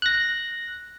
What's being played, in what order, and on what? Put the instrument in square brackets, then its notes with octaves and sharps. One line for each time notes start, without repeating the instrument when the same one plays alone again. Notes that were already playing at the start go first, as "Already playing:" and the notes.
[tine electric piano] F#6 A#6